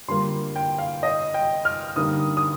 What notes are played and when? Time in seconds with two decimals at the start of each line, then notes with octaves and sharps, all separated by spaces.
0.08 D3 G3 A#3 F4 C6
0.56 G5
0.78 F5
1.03 D#5
1.34 G5
1.65 F6
1.96 G2 D3 G3 A#3 D#4 D#6
2.37 D#6